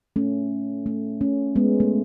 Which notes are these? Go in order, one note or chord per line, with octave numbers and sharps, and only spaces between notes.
A3 C#4
A3
A3 C#4
G#3 B3
A3